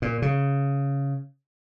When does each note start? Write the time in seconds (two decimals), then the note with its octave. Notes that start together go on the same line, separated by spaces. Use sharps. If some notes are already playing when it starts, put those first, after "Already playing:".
0.02 A#2
0.22 C#3